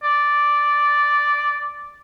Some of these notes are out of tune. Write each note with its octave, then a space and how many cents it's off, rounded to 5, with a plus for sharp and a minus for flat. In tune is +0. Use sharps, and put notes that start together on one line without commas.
D5 -5